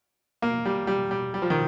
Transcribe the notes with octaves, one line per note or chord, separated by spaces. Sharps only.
A#3
G3
G3
G3
G3
F3
D#3